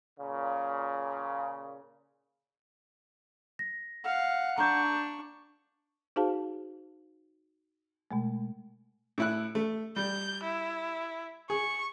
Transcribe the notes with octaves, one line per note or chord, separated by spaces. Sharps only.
A#2 C#3
A#6
F5 F#5
D4 A#5 C#6 G6
D#4 F#4 G#4 C5 F5 A5
B2 G#3 A3
A2 E4 F#6
A3
G3 G6
E4
G#4 C#6